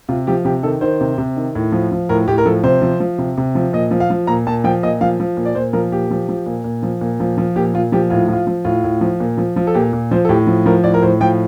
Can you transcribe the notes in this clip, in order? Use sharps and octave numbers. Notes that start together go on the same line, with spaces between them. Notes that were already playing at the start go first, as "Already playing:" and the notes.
C3 F4
F3 G4
C3 G4
D#3 A4
D#3 C5
C3
C3
D#3
A2
F3
F3
A2 A#4
A2 G4
A#4
F3 A4
C3 C5
F3
F3
C3
C3
F3
A#2 D#5
F3
F5
F3
A#2 A#5
A#2 A5
F3 G5
A#2 D#5
F3 F5
F3
A#2
D5
A#2 C5
F3 A#4
A#2 G4
F3
F3
A#2
A#2
F3
A#2
F3
F3
A#2 G4
A#2 F4
F3 G4
A2 F4
F3 F4
F3
A2 F4
A2
F3
A#2
F3
F3
A4
A#2 G4
A#2
F3 C5
A4
A2 G4
F3
F3 A#4
A2 D5
A#4
A2 C5
F3 G5